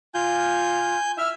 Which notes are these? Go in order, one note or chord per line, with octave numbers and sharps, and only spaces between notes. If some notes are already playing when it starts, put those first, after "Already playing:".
F4 G#5 G6
E5 F6